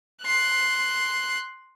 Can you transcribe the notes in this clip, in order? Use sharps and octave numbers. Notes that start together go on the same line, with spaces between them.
C6 F#6